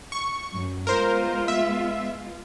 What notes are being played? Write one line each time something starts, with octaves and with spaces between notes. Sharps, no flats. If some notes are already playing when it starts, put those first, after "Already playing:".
C#6
F#2
G#3 B3 F4 A#4 C5
E5